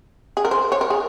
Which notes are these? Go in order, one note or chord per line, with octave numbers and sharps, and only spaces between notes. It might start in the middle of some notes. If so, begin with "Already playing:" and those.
G#4
A#4
C5
C#5
A#4
G#4